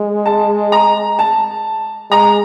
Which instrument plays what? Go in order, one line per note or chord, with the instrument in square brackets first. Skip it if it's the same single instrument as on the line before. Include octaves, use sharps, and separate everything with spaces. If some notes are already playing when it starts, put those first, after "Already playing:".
Already playing: [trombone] G#3
[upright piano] A5
A#5
A5
[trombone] G#3 [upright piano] A#5